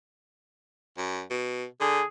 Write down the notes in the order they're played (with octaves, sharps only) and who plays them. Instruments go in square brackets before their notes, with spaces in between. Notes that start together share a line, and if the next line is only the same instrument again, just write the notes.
[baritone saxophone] F#2
B2
[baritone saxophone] D3 [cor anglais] G#4